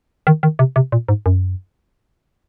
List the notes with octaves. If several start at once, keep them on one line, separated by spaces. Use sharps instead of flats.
D#3
D#3
C3
C3
A#2
G#2
F#2